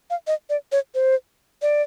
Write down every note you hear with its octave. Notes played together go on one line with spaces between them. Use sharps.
F5
D#5
D5
C#5
C5
D5